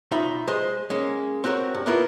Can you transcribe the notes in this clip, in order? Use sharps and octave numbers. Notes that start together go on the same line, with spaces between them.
B1 D#4 F4 E5 B5
G#3 C5 D#5
G#3 A#3 C#4
C4 F#4 G4 A#4 C#5
G2
A#3 B3 E4 F4 A#4